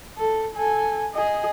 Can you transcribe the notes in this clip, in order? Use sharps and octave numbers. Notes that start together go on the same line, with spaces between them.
A4
A4 G#5
G#4 D#5